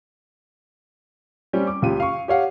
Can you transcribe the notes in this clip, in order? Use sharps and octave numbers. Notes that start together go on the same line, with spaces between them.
G3 C4 C#4 G4
D6
C#2 C#3 F4 G4 D#7
F5 C#6
G4 C#5 F5 F#5